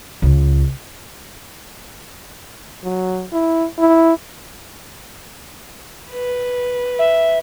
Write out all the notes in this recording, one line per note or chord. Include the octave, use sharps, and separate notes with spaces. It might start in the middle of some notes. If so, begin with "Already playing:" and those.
C#2
F#3
E4
E4
B4
E5